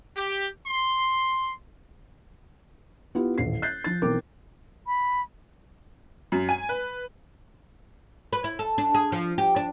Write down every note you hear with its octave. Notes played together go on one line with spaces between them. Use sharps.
G4
C6
B3 E4 F4 G4
D#1 A1 C7
F#6 G6 A6 C7
F3 A6
B1 E3 C4 A#4 D6
B5
F#2
G#5
B4
B4
E4
A4
D4
G#4
F3
G4
D4